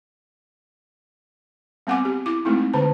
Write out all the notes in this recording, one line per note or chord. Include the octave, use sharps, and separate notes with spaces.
G3 B3 C4 F#5 G#5 D6
G4
E4 D6
G#3 A3 C4 D#4 E4
D3 C5 A5